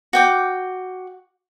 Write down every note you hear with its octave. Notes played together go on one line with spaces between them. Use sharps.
F#4 G5 D6